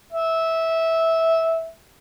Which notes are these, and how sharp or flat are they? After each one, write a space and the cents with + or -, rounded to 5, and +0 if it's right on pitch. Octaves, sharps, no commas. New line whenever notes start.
E5 -15